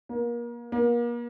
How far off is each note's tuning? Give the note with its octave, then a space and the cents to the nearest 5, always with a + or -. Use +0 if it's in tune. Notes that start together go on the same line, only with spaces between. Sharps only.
A#3 +30
A#3 +35